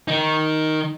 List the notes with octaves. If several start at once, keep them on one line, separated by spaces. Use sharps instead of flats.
D#3 D#4